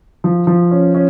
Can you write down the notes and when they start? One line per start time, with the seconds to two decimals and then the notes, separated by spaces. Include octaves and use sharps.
0.24 F3
0.47 F3
0.71 C#4
0.95 C#4